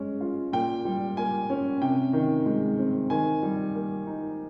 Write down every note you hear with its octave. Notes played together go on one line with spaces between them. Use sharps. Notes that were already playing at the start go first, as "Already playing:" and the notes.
Already playing: G#3 C#4
F4
A#2 G5
G3
A#3 G#5
C#4
C3 G5
D#3
G#3
C4
D#3 G#5
G3
A#3
D#4